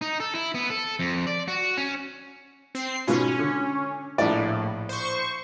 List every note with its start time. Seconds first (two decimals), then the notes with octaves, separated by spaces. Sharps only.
0.01 D#4
0.20 A4
0.35 E4
0.55 B3
0.70 A4
1.00 F2
1.27 D5
1.48 F#4
1.77 C#4
2.75 C4 C7
3.08 G#2 B2 C#4 F4
3.39 D3
4.18 A#1 A2 E4 D5
4.89 C5 C#6